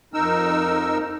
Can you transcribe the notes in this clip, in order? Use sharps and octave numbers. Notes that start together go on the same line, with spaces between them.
F2 D#4 A#4 E6